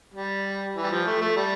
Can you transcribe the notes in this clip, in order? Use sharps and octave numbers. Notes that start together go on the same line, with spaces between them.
G3
E3
G3
F3
A3
A3
G3